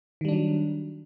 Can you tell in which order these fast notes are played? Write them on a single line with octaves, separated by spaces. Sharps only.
D#3 G3 D4 F#3